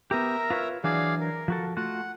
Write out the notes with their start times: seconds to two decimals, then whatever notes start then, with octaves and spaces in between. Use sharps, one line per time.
0.11 B3 G4 A#4 E5 A#5
0.50 F4 B4 C#5
0.84 E3 F#3 D4 G#4 D5 F5
1.20 A#4
1.48 F3 F#4 A4
1.77 A3 F4 F#4 F#5